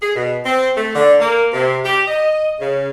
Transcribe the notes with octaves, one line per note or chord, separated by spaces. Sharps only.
G#4
B2
C4
A3
D3
A#3
C3
G4
D#5
C#3